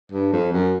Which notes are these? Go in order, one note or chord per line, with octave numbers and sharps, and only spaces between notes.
G2
F2
F#2